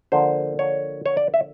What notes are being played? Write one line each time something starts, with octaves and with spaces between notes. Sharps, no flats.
D3 F3 A#3 C5
C#5
C#5
D5
E5